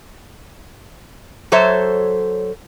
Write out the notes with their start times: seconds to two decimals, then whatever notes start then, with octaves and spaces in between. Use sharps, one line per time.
1.52 F#3 A4 C5 C#5 E5